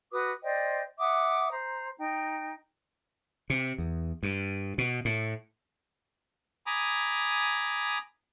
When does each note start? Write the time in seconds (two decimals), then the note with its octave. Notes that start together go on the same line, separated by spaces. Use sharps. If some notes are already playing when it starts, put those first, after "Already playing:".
0.12 F#4 B4 D6 D#6
0.43 C5 D5 D#5 G5
0.99 E5 F#5 D6 D#6
1.51 C5 A#5
1.99 D#4 G5
3.50 C3
3.78 E2
4.23 G2
4.78 B2
5.05 A2
6.66 G#5 A#5 B5 D6 D#6